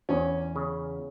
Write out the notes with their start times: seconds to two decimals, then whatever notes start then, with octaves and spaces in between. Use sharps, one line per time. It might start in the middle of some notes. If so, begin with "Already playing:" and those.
0.09 E2 C#4
0.56 C#3